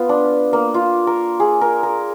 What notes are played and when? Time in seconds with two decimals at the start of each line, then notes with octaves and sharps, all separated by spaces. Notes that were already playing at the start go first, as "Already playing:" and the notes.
Already playing: B3 F4
0.09 D4
0.53 A#3
0.74 F4
1.07 A#4
1.40 G#4
1.61 A#4
1.83 A#4